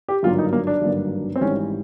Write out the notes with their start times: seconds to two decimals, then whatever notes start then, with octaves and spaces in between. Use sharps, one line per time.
0.08 G4
0.23 G#1 G2 D3 F#3 A#3 F4
0.38 D#4
0.53 A#3
0.67 D4
0.82 G#1 G2 D3 F#3 A#3
1.36 C4
1.41 G#1 G#2 E3 G3 C#4